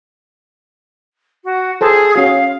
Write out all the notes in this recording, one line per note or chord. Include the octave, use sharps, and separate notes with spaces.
F#4
G#4 A4 C5 A5
C#4 F#4 F5